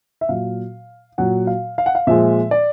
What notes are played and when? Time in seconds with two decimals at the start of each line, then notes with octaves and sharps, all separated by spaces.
0.21 E5
0.29 A#2 F#3 F5
1.18 A#2 F#3 F#5
1.47 F5
1.78 F5
1.86 F#5
1.95 F5
2.07 A#2 F3 G#3 E5
2.51 D5